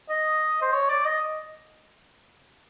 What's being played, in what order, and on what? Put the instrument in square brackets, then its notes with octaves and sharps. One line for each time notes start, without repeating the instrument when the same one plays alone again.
[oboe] D#5
C5
C#5
D5
D#5